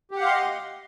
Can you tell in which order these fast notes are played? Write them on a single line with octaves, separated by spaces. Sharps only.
G4 F#5 F5 C6 D#5